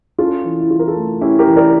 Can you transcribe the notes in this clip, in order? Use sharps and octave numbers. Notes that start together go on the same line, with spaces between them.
C#4 F4 A4
E3
E4
E3 F4
A#4
F4 A4
A3
C#4 E4 G4
G4 A#4
E3
A#4 D5